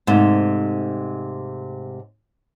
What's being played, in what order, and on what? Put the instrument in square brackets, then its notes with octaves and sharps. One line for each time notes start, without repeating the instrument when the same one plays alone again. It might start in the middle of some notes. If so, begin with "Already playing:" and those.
[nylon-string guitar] G#2 C3 A3